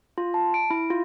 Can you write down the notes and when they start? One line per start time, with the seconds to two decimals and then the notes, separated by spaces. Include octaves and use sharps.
0.18 F4
0.34 A5
0.54 D7
0.70 E4
0.90 F4